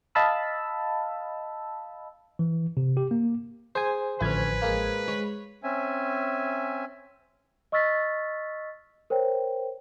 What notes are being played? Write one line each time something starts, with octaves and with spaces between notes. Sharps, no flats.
D#5 F5 A5 B5 E6
E3
C3
G4
A#3
G#4 C5 G#5
A1 D2 F3 C#4 B4 G#6
G#3 A#3
G#3 C#5 B5
C4 C#4 E5 G#5
D#5 C#6 E6 F6 A6 B6
A#4 C5 C#5 G5